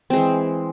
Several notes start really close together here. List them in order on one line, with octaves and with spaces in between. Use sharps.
C4 G#3 E3